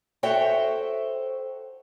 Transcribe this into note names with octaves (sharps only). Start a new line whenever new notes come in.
F#4 A4 C5 C#5 E5 G5